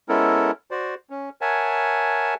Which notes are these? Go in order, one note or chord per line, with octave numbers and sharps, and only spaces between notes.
G#3 B3 C#4 E4 A4 A#4
F#4 C5 D5
C#4
A#4 C#5 E5 F#5 G#5 A5